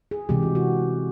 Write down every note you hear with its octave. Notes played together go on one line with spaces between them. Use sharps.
G#4
C3 E3 G#3 G4
F#4
F#4